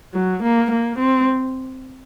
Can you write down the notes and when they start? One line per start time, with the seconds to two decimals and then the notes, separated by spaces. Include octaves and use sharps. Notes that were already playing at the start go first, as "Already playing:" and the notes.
0.14 F#3
0.43 A#3
0.71 A#3
0.99 C4